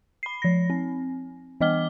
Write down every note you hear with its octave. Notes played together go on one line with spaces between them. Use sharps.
B5 C7
F3 A#6
C4
E3 B3 D#5 D6 F6 G7